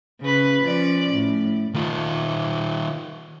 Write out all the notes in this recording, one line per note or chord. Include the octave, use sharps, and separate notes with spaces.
C#3 B4
F3 C#4 D5
A2
D#3 F4